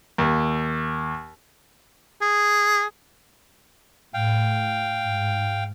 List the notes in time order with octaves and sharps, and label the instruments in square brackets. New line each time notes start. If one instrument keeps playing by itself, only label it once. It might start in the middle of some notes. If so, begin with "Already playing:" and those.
[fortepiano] D#2
[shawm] G#4
[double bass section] A2 [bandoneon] F5 G5
[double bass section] G#2